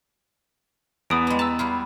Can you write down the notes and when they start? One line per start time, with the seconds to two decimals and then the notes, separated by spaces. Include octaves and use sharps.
1.10 E2 B3 B5 D#6 D7
1.27 G3 G#3
1.39 A5 A#5 E6
1.59 G3 E4 F4